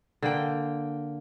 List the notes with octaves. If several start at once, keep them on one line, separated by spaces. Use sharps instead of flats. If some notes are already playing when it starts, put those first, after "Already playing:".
D3 A#3 G5